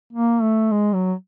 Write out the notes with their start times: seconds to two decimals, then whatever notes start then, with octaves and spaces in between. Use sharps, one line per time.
0.13 A#3
0.41 A3
0.71 G#3
0.93 F#3